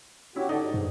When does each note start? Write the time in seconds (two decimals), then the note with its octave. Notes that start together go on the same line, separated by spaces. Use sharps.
0.36 C#4 E4 F#4 G4
0.49 D3 D#4 F#4 A4 D5
0.62 G#2
0.74 G2